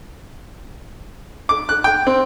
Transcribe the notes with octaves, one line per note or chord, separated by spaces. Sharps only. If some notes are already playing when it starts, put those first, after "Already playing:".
D6
F#6
G5
C4